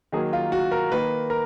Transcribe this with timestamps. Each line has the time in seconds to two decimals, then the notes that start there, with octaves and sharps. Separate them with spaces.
0.12 D#3 F#3 A#3 G#4
0.33 F4
0.52 F#4
0.71 A#4
0.92 D#3 A#3 B4
1.30 A#4